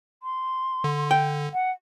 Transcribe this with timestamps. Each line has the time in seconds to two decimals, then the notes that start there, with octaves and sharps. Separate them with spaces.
0.23 C6
0.84 D3
1.11 G5
1.54 F#5